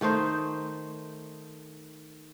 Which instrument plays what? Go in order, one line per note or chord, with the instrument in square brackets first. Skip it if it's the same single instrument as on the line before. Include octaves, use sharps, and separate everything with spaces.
[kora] D#3 A3 D#4 C5